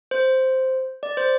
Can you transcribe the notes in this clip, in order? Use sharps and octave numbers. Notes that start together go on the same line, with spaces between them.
C5
D5
C5